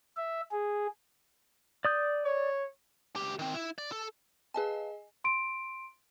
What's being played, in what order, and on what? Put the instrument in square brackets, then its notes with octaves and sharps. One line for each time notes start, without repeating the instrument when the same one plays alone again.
[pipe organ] E5
G#4
[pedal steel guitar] D5 D#6 G6
[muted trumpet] C#5
[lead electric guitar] C#2 G4
D#3 C4
E4
D5
A4
[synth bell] G#4 D#5 G#5 [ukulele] B4 F5 A5
[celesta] C6 D7